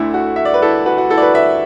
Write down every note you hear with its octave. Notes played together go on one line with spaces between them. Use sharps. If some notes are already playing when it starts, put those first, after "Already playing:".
Already playing: D2 D3 A3 E4
F#4
E5
D5
B4
E4 A4
F#4 B4
F#4
E4 A4
D5
F#4 B4
B4 E5